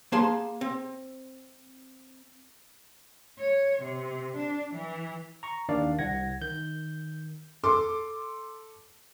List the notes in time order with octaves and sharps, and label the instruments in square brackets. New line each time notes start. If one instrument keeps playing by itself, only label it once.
[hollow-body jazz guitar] A#3 G#4 A5 C6
C4
[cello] C#5
C3
D4
E3
[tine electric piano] A#5 C#6
D#2 D#3 D4 D5 F5
C2 F#5 G#6 A#6
D#3 G6
[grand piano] A4 C6 D6